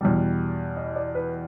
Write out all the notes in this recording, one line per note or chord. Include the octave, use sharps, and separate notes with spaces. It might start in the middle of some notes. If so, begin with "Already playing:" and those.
E2 B2 G3
D#5
D5
B4